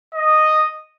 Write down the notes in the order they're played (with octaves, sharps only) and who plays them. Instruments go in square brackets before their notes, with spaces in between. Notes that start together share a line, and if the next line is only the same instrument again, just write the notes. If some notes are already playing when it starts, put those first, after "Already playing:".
[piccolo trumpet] D#5